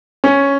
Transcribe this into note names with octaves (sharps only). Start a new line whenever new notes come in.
C#4